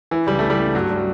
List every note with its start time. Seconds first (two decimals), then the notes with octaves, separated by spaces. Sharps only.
0.11 E3 E4
0.27 C#2 G3
0.39 C#2 A3
0.50 G3
0.58 A3
0.75 G2 F#3
0.90 G3
0.97 F#3